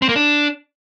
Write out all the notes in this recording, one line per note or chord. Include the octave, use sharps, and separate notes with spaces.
C4
A#3
D4